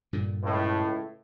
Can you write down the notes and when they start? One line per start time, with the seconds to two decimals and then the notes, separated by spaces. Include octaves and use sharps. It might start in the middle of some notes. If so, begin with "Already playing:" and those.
0.13 G2 A#2 D3
0.43 C#2 A2